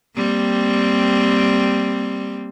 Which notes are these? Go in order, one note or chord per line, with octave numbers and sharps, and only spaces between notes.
G3 A#3 C4